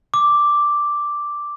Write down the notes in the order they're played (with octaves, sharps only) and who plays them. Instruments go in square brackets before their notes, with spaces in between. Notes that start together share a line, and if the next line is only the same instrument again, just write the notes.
[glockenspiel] D6